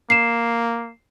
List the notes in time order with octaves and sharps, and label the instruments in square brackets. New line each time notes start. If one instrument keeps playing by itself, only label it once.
[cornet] A#3 [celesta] C7 E7